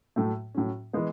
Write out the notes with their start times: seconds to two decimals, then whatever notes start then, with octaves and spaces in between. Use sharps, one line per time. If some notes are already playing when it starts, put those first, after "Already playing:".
0.16 A2 F#3 A3
0.55 A2 F#3 C#4
0.93 E3 G#3 B3